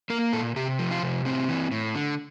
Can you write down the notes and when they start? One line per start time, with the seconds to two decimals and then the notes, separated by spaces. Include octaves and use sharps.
0.10 A#3 A#4
0.33 A#2 A4
0.56 C3 G4
0.79 F3
0.91 F4
1.03 C3
1.25 A2 C4
1.49 E3
1.71 A2
1.95 D3